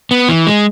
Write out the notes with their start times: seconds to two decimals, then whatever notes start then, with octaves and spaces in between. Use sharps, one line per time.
0.11 B3
0.29 E3
0.47 G#3